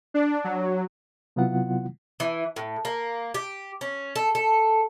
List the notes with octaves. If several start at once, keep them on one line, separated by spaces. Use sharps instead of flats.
D4
F#3
C3 F#3 B3 E4 F4 F#5
E3
A2
A#3
G4
C#4
A4
A4